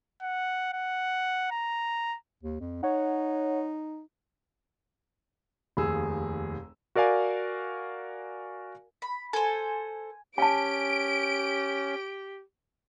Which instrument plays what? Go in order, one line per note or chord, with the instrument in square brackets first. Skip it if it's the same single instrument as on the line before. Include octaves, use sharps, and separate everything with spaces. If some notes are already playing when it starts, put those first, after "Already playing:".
[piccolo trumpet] F#5
F#5
A#5
[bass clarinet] D#2
F2
[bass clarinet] D#4 [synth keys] C#5 F#5
[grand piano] F1 D#2 G#4 E6
[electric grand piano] F#4 A#4 D5 F5 G#5
[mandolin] B5
[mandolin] A4 C5 [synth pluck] G#5
[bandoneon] C#4 [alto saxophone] G4 [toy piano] G#5 A5 [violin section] D7